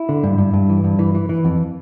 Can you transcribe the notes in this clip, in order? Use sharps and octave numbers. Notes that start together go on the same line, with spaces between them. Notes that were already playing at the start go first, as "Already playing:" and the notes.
Already playing: E4
D3
G2
G2
G2
E3
G2
E3
E3
E3
F2